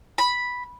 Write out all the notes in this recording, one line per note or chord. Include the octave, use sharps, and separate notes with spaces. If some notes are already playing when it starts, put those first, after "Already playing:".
B5